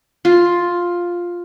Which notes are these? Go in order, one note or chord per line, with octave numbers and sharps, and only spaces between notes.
F4